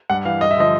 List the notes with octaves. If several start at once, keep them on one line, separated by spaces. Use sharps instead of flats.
G2 F#5
E3 F5
G2 D#5
E5
D3 F3 D#5